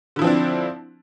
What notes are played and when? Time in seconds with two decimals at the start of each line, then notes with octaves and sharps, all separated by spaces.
0.16 D3
0.19 E4
0.22 F3
0.24 C4
0.27 D4